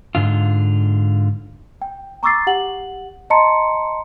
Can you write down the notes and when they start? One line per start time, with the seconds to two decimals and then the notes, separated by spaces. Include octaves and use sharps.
0.15 G#2 D3 F4
1.82 G5
2.23 A#5 C#6 D6 E6 A6 C7
2.47 G4 F#5 F#7
3.30 D#5 A5 A#5 C6 C#7